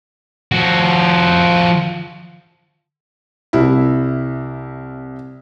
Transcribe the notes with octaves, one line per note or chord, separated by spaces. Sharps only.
F3 F#4
C2 E4